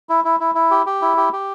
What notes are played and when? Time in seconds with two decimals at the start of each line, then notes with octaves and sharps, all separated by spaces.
0.09 E4
0.24 E4
0.40 E4
0.55 E4
0.71 G4
0.86 G4
1.02 E4
1.17 G4
1.33 G4